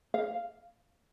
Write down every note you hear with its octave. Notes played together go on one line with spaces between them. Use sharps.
F5